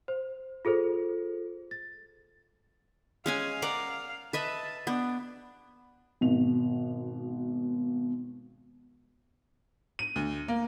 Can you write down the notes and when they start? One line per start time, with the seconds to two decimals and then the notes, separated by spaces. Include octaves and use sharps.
0.08 C5
0.65 F4 G#4 A4 C5
1.71 A6
3.26 G#3 C#4 F5 G#5
3.62 A#4 D5 F#5
4.33 B4 D#5 E5 A5
4.87 B3 D4
6.21 G#1 B2 F7
9.99 D#7
10.16 D2
10.48 A#3